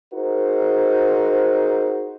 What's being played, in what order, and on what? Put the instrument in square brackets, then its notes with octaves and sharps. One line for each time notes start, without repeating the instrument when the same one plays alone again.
[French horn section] D#4 F#4 G#4 A#4 C5